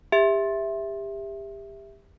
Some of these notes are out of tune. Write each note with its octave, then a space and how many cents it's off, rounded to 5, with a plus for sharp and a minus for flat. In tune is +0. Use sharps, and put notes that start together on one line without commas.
G4 +25 E5 +0